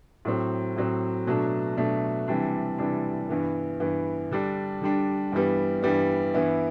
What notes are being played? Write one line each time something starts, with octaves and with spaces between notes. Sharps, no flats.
A2 F#3 C4
A2 F#3 C4
B2 F#3 A3 D4
B2 F#3 A3 D4
C3 E3 G3 D4
C3 E3 G3 D4
G2 E3 B3
G2 E3 B3
D3 G3 D4
D3 G3 D4
G2 E3 G3 B3
G2 E3 G3 B3
G2 E3 B3 E4